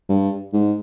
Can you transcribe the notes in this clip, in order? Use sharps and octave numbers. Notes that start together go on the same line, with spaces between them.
G2
G#2